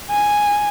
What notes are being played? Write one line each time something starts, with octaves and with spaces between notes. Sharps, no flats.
G#5